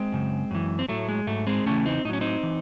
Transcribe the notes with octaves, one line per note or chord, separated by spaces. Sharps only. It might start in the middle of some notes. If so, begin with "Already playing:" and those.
Already playing: G#3 C4
F#2 C#3
F#2 E3
C4
A2 F#3 A3
G#3
G#2 F#3 A3
G#3 C4
E2 C#3 E3 A3 C#4
C4 D#4
A2 F#3 C#4 D#4
C4 D#4
E3